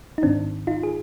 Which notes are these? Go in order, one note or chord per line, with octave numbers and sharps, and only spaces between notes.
D#4
G#2 D#3 C4 D4
D#4 F4
G#4